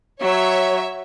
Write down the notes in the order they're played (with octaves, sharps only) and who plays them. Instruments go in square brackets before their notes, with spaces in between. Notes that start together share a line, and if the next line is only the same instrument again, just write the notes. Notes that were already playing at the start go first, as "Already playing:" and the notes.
[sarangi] F#3 [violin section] C#5 E5